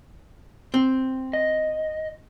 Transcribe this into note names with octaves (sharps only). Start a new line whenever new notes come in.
C4
D#5